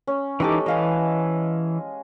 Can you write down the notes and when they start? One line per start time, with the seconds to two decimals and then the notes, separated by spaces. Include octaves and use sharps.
0.07 C#4
0.40 E3 G#3 D#4 G4 A4 D6
0.66 E3 D#5 F5 G#5